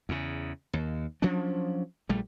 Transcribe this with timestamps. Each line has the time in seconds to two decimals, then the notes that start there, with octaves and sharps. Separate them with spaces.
0.09 E2 C#3
0.73 D#2
1.22 F3 F#3 C#4 D4
2.09 A#1 G3 A3